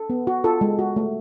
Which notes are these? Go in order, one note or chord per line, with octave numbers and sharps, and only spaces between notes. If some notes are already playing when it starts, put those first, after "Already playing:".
Already playing: A4
B3
F#4
F4 A4
G#3
F#4
A3